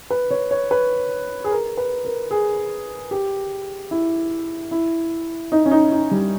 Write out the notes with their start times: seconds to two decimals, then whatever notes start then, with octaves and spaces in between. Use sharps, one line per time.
0.10 B4
0.31 C#5
0.51 C#5
0.71 B4
1.44 G#4
1.51 A#4
1.77 B4
2.05 A#4
2.31 G#4
3.11 G4
3.91 E4
4.71 E4
5.52 D#4
5.65 C#4
5.71 D#4
5.92 D#4
6.11 G3